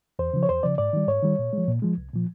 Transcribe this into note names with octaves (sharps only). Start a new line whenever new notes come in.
E2 C5
C#3 F3
C#5
E2 C5
C#3 F3 D5
G#2 D5
D#3 G3
G#2 C#5
D#3 G3
A#2
F3 G#3
A#2
F3 G#3
C2
A#2 F3